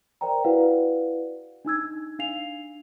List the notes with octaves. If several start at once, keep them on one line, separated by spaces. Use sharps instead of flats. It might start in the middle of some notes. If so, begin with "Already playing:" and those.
A#4 C5 D5 G5 A#5
E4 F#4 B4 D5 F5 F#5
D4 D#4 E6 G#6
D4 F5 C7 F7